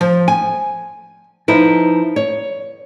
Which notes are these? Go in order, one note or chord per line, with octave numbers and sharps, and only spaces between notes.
F3
G#5
F3 D#4 E4 B4
C#5